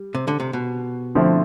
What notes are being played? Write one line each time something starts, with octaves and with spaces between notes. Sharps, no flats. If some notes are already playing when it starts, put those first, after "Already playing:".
Already playing: G3
C3
D3
C3
B2
D3 F3 A3 C4 E4